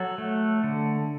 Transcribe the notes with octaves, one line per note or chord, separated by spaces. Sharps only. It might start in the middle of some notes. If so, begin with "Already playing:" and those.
Already playing: F#3 A4
A3
D3